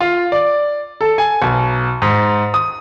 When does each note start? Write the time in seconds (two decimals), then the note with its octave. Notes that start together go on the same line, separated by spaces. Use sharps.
0.01 F4
0.32 D5
1.01 A4
1.18 G#5
1.42 B1
2.02 G#2
2.54 D#6